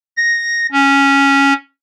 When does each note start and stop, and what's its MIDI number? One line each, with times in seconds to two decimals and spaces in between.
0.17 0.67 94
0.72 1.53 61